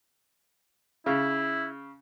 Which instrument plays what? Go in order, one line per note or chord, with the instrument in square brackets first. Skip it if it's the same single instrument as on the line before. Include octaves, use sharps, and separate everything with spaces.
[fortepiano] C#3 [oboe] E4